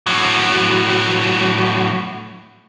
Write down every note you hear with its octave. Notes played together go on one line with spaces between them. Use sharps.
A2 F#3